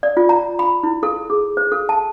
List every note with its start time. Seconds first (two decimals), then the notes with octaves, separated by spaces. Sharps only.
0.03 D5
0.17 F4
0.29 A#5
0.59 B5
0.83 E4
1.03 A4
1.30 G#4
1.57 C5
1.72 A4
1.89 A5